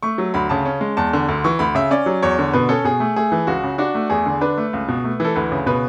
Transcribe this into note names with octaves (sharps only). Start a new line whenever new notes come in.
A3 C#6
F#3
D2 B5
C#3 A5
C#4
G#3
E2 A5
D3
D2
E3 C#6
D2 B5
C#3 E5
C#4 D5
F#3
E2 C#5
D3
B2 B4
C#4 A4
B2 G#4
A3
A3 G#4
E3
C#2 F#4
C#3
D4 F#4
A3
E2 G#4
D3
D4 B4
A3
C#2
B2
A3
E3 A4
D2 B4
C#3
B2 B4